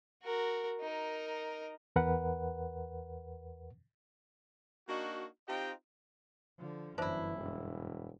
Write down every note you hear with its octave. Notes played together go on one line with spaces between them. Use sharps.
F#4 A#4
D#4 A#4
E2 A#4 B4 F#5
A#3 D4 D#4 F#4
C4 D#4 F4 G4 D#5 G5
D3 F3
G1 F#2 E3 D4 E4 F4 C5 E5
E1